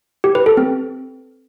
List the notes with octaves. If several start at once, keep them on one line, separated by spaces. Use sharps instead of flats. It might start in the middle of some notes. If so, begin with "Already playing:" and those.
G4
B4
A4
C4